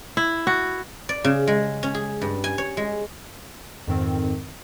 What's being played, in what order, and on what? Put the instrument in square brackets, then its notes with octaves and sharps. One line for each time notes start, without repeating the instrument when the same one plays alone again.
[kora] E4
F#4
[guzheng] D5
C#3
G#3
C#4
G#4
G2
G#5
C#5
G#3
[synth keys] F2 G#2 D#3 C4